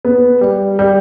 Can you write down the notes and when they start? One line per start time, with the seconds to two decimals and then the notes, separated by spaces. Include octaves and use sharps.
0.05 B3
0.41 G3
0.79 G3